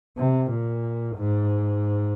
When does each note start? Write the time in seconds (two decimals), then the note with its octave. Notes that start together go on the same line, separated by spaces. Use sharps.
0.17 C3
0.50 A#2
1.17 G#2